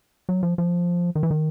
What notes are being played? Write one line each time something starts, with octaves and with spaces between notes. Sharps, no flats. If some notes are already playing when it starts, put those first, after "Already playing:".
F#3
F3
F3
D#3
E3
D#3